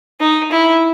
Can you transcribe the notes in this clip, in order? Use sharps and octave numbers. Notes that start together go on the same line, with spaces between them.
D#4
E4